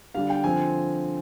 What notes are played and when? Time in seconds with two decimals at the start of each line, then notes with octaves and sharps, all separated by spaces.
0.14 D3 G3 D4 F5
0.30 G5
0.44 D3 F3 C4 G#5